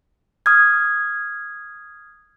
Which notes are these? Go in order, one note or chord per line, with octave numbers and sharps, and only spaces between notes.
D#6 F6 G#6